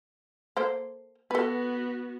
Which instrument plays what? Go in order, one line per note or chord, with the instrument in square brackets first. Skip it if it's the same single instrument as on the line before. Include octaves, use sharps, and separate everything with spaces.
[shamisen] A#3 A4 C5
[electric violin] B3 F#4 [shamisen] A4 B4